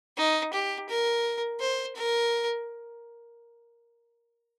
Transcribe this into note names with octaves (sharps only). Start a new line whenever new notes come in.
D#4
G4
A#4
C5
A#4